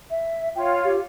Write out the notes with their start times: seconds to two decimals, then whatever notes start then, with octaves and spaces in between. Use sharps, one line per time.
0.10 E5
0.56 F4 C#5 G5
0.84 G4